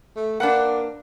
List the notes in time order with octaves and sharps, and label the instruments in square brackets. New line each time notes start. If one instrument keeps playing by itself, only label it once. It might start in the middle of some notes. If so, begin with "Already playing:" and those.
[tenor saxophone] A3
[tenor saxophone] A#3 [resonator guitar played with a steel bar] D4 B4 F#5